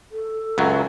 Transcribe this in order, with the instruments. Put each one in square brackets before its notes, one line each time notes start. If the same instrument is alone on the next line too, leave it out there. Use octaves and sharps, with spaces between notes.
[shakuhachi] A4
[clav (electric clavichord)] C#2 F#2 F#3